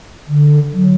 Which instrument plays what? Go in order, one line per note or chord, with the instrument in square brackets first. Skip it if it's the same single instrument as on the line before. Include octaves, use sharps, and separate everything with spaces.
[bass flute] D3
F#3